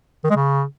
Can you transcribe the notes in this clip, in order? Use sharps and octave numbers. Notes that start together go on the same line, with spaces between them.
D#3
G#3
C#3